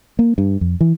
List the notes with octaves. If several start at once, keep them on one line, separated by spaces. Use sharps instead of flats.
A#3
G2
F2
E3